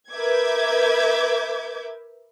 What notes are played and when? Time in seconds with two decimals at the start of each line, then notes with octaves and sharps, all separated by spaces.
0.12 A#4 B4 E5 D6 G6 G#6